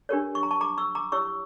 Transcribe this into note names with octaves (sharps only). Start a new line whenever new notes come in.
D4 G4 A#4 C#5
C#6
A#5
A5 C#6
A#5 D6
C#6 E6
A#5 D6
E4 G4 C#5 C#6 E6